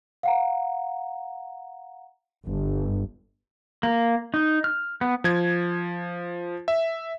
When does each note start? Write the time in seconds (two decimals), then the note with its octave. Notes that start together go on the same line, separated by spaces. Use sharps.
0.23 F5 F#5 A#5
2.47 G1
3.83 A#3
4.34 D#4
4.64 F6
5.01 B3
5.24 F3 G#6
6.68 E5